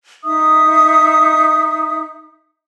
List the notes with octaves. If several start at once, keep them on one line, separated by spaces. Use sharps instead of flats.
D#4 E5 D#6